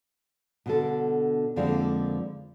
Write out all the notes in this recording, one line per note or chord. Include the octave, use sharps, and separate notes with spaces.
B2 D3 A4
F2 D3 F3 G#3 A#3 C4